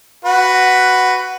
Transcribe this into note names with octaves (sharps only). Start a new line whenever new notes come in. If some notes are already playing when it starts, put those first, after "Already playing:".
F#4 B4